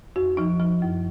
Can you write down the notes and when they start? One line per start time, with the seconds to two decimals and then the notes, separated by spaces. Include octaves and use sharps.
0.16 F2 F#4
0.37 F3 D#4
0.60 F3
0.82 F#2